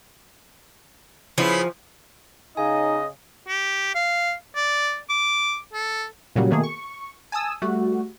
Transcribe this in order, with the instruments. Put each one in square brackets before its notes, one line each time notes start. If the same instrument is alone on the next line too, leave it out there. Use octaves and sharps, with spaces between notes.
[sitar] C#3 B3 E4 [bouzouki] F3
[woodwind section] C#3 [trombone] D#4 [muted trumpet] D#5 [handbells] G#5
[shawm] G4
F5
D5
D6
A4
[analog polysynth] A#2 C#3 F#3 G3
B2 D#3 A3 A#3 G#4
C#6
G#5 A5 D#6 E6
G3 A3 F#4